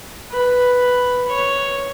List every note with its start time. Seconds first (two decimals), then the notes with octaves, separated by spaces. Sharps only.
0.31 B4
1.28 C#5